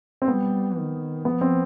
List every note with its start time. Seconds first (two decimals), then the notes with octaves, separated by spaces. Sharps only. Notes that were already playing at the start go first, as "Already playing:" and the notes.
0.22 C4
0.28 G3 B3
0.77 D#3
1.25 F3 B3
1.41 C4